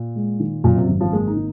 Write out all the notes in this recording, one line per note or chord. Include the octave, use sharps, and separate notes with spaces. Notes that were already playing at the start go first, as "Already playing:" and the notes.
Already playing: A#2
G#3
D#3
F#2 A#2
C3
G#1
F3
G#3 A#3
D#4
D#3